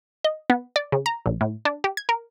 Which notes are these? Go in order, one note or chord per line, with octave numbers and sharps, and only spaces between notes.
D#5
B3
D5
C#3
A#5
A#1
A2
D4
G4
G#6
A#4